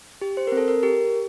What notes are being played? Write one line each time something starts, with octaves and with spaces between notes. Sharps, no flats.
G4
C5
C4 A#4
A4
A#4
G4 A#4